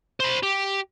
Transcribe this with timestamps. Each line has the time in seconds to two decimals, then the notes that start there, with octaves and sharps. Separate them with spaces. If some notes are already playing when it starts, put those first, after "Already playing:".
0.20 C5 B5
0.43 G4